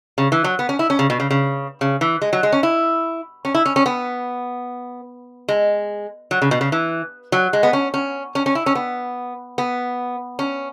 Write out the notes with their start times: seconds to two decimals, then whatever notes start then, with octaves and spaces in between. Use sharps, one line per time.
0.18 C#3
0.32 E3
0.44 F#3
0.59 B3
0.69 C#4
0.79 E4
0.90 C#4
0.99 C#3
1.10 B2
1.20 C#3
1.31 C#3
1.81 C#3
2.01 E3
2.22 G#3
2.33 F#3
2.43 G#3
2.53 C#4
2.63 E4
3.45 C#4
3.55 E4
3.66 C#4
3.76 C#4
3.86 B3
5.49 G#3
6.31 F#3
6.42 C#3
6.51 B2
6.61 C#3
6.72 E3
7.32 F#3
7.53 G#3
7.63 B3
7.73 C#4
7.94 C#4
8.35 C#4
8.46 C#4
8.55 E4
8.66 C#4
8.75 B3
9.58 B3
10.39 C#4